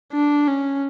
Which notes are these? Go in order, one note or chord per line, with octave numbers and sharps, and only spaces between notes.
D4
C#4